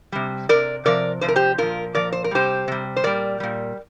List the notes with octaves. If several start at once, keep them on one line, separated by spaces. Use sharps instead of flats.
C3 G3
C3 G3 A#4 D5
C3 F3 A#4 D5
C3 F3 C5
A#4
G4 C5
A#2 F3 F4 A#4
A#2 F3 A#4 D5
C5
A#4
C3 G3 G4 C5
C3 G3
C5
A#2 G3 A#4 D5
A#2 G3